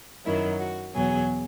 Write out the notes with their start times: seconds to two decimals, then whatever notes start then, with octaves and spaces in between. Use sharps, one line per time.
0.25 F#2 D#3 F#3 E4
0.60 F#4
0.95 E2 B2 F#3 G#4